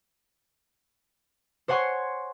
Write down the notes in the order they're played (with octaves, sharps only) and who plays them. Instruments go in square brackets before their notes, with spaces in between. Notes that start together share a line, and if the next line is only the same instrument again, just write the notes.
[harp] C5 C#5 F#5 G#5 C6 C#6